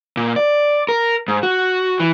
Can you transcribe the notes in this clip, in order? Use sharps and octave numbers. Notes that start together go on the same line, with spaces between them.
A#2
D5
A#4
G#2
F#4
E3